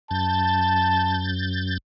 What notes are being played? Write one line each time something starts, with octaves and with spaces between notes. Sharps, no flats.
F#2 A5 G6 A6